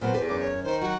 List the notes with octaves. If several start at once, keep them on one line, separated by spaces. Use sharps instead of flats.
A#2 F#3 B3 C5
E2 G4 A4 B4
F#2 C#4 D6
C#5
D#3 C5
F#3 F#4